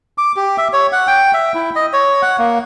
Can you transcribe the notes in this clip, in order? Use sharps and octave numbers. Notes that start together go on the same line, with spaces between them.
D6
G4
E5
C#5
F#5
G5
E5
E4
D#5
C#5
F#5
A#3